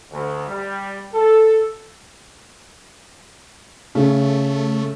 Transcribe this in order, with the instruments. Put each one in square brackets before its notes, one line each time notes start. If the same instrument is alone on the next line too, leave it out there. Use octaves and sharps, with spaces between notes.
[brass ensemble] D2
G3
A4
[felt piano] C#3 [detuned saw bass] A3